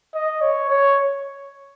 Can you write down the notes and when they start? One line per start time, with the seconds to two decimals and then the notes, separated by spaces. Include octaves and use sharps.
0.14 D#5
0.41 C#5
0.70 C#5